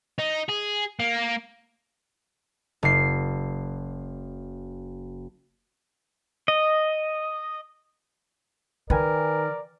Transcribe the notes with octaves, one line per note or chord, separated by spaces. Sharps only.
D#4
G#4
A#3
F#1 C7
D#5
D#3 A#4 B4 D5 G5 G#5